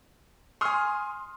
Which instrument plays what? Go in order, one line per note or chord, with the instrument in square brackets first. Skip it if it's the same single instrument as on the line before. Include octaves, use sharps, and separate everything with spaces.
[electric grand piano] G#5 C#6 [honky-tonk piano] C6 D#6 F6